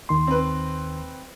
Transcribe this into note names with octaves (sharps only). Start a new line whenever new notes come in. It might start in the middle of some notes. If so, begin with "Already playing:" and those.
D#2 D#3 C6
C4 B4